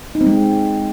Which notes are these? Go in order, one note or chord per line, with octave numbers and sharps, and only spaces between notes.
D#4
C4
G#3